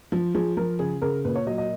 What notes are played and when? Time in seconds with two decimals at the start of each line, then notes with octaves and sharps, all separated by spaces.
0.12 F3
0.35 F3 G#4
0.57 F3 A#4
0.79 C#3 G#4
1.02 C#3 A#4
1.25 A#2 B4
1.36 C#5
1.47 F#3 D#5
1.58 D#5